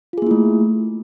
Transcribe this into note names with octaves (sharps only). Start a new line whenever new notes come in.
A3 A#3 E4 F4 G#4